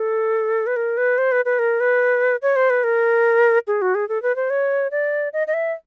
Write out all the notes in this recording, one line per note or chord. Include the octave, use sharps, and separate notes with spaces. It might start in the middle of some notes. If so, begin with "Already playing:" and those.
Already playing: A4
B4
A#4
B4
C5
B4
B4
A#4
B4
C#5
C5
B4
A#4
G#4
F#4
G#4
A4
B4
C5
C#5
D5
D#5
D#5
E5